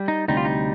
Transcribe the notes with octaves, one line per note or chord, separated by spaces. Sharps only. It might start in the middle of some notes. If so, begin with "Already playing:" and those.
Already playing: G3
D#4
D2 C3 G3 D#4
F4
D#4